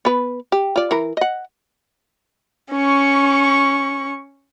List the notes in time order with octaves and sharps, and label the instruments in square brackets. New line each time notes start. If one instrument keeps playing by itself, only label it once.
[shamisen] B3 B4
G4
F4 D5
E3 A#4
D#5 F#5
[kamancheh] C#4 C#6